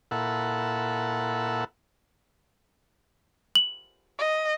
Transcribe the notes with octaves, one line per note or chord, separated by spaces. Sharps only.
A#2 E4 A4 F#5
F#7
D#5